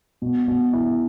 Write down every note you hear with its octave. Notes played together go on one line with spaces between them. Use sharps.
B2
B2
E4